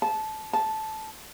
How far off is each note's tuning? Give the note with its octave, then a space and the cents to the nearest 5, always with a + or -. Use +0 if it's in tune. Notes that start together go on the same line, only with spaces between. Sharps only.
A5 -15
A5 -10